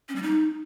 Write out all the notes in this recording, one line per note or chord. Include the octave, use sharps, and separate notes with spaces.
C#4
G3
D#4